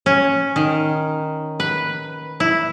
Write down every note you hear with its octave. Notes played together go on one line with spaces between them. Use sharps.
C#4
D#3
B4
E4